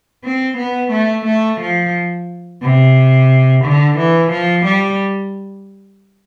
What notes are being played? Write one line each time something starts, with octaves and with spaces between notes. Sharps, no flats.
C4
B3
A3
A3
F3
C3
D3
E3
F3
G3